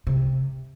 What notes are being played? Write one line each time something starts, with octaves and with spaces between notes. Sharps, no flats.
C3